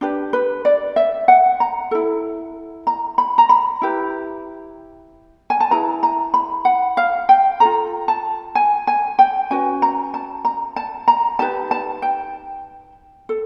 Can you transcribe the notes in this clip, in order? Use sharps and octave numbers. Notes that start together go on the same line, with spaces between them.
D4 G4 B4
B4
D5
E5
F#5
A#5
E4 A4
A#5
B5
A#5
B5
E4 G4 B4
G#5
A5
E4 G#4 B4 A#5
A#5
B5
F#5
F5
G5
F4 A4 A#5
A5
G#5
G#5
G5
C#4 F#4 B4 G#5
A#5
A5
A#5
A5
A#5
D#4 G4 B4 A5
A5
G5
A4